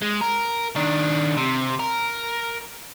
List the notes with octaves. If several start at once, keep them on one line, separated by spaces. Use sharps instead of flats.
G#3
A#4
D#3 D4
C3
A#4